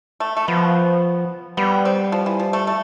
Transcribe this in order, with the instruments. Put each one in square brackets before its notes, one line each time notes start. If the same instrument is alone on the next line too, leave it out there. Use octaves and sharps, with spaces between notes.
[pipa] A3
A3
[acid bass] F3 [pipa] B3
[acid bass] G3 [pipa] B3
[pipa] C4
F3
E3
F3
A3
A3